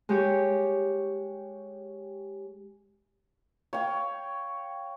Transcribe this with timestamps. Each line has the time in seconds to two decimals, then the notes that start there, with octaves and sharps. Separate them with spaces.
0.09 G#3 G4 C#5
3.73 C#5 F5 G5